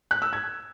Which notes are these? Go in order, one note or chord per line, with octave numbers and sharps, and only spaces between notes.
F#6
E6
G#6